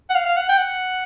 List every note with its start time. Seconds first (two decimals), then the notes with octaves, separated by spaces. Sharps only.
0.10 F#5
0.15 F5
0.26 F5
0.37 F#5
0.49 G5
0.58 F#5